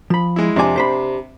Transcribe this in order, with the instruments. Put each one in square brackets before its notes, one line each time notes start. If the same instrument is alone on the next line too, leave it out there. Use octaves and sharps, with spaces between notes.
[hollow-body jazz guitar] F3 B5
[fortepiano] G#3 E4
[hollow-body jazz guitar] F2 G#5 [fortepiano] C3 D4 D6
[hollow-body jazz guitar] G4 C5 B5